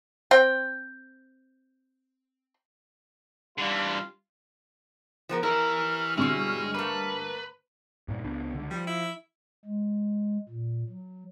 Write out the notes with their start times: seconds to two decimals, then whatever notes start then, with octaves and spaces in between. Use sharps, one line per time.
0.31 C4 G5
3.58 D3 E3 G3 F4
5.29 F3 B3 A#4
5.43 E3 E4 G4 A#4 C#5 F6
6.17 G2 B2 D3 G#3 E4 G#4 C#6
6.74 A3 A#3 B4
8.08 G2 A#2
8.24 C#2 B3 D4
8.53 C#2 D3
8.70 F3 G3
8.87 E4
9.65 G#3
10.49 A#2
10.89 F#3